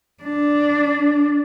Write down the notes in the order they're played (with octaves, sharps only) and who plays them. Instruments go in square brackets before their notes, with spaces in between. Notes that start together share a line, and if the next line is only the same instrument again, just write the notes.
[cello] D4